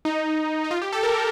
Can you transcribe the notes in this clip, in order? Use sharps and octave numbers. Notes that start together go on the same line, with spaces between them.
D#4
D#4
F4
G4
A4
A#4